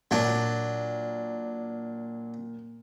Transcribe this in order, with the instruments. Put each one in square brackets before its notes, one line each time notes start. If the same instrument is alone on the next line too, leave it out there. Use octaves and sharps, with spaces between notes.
[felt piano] A#2 [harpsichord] F#3 D4